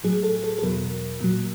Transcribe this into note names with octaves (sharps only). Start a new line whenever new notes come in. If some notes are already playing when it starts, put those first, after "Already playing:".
A2 F#3 G#4
A4
A4
A4
E2 B2 F#3 A#4
A#2 F#3